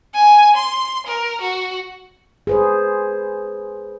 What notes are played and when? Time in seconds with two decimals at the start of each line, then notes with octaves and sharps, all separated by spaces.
0.14 G#5
0.56 C6
1.06 A#4
1.41 F#4
2.47 G#4 B4 C5